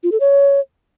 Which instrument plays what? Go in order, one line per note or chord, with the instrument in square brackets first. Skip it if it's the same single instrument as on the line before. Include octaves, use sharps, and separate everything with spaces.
[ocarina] F4
A4
C#5